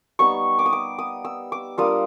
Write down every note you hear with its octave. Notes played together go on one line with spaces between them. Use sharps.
G3 B3 D#4 C#6
D6
D#6
D6
D#6
E6
D6
G3 A#3 D4 F4 D#6